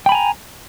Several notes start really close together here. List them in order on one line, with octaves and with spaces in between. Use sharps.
G5 B5 G#5 A#5